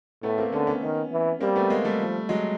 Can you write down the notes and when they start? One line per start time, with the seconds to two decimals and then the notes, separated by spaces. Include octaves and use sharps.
0.23 A2 A3 B3
0.38 A#3 C4
0.52 D3 B3 C#4
0.67 B3 C#4
0.82 D#3
1.12 E3
1.41 G3 A#3 C4
1.55 A3 B3
1.70 G#3 A#3
1.84 G3 A3
2.00 F3
2.29 F#3 G#3